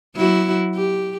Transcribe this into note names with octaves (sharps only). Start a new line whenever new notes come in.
F#3 E4 F#4
G4